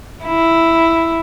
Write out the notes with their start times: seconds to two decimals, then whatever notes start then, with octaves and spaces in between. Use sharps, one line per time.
0.24 E4